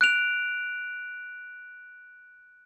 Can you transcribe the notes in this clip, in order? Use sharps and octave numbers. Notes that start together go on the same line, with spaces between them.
F#6 D7 F7